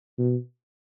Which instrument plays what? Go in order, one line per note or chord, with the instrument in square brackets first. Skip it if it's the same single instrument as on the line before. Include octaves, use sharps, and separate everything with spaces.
[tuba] B2